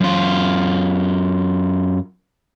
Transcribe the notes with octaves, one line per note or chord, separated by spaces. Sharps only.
F#2 F4